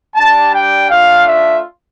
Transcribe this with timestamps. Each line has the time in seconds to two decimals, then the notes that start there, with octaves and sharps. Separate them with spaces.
0.15 G3 D4 G4 A5
0.52 G5
0.89 A3 D4 F4 F5
1.26 E5